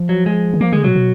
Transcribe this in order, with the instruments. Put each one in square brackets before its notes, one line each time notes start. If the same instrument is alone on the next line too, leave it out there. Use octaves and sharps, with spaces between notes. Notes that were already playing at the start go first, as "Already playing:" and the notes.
Already playing: [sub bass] F3
[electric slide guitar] F#3
G#3
[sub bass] D#3
[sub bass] F3 [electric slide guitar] A#3
[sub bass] D3 [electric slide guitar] G#3
[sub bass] B2 [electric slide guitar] F#3
[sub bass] B2